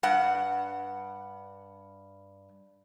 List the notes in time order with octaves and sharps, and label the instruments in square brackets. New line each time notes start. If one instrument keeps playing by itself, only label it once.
[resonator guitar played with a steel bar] G2 F#5